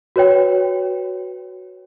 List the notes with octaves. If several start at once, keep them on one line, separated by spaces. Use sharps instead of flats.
F#4 B4 C#5 G5